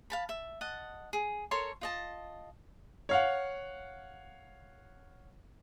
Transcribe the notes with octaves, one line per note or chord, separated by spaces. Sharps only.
F5 A5 B5
E5
D#5 F#5 A5
G#4
A4 A#4 C#5 C6
F4 D#5 A5
C#5 F5 F#5